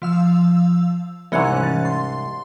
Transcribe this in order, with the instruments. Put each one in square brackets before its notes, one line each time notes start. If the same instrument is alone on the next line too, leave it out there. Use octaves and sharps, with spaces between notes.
[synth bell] F3 F5 E6
[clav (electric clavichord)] C2 G#2 [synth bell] E3 C#4 F#6
[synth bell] A6
C6